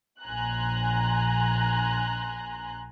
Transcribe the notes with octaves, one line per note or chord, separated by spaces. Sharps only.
A#1 G#5 A#5 C6 F#6